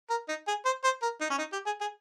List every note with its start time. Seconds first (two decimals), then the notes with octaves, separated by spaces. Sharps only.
0.10 A#4
0.29 D#4
0.47 G#4
0.65 C5
0.84 C5
1.02 A#4
1.21 D#4
1.30 C#4
1.38 D#4
1.53 G4
1.66 G#4
1.81 G#4